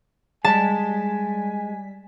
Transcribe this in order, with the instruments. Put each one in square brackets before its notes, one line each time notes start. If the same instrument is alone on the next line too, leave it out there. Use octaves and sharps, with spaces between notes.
[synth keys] G3 B6 [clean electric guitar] G#3 [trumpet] G#5 [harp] A5